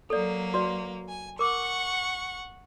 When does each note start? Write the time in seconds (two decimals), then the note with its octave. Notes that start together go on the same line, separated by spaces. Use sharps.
0.10 F#3 A#3 A4 D5
0.54 F#4 B4 D5
1.09 G#5
1.39 A#4 F#5 C#6 D6 E6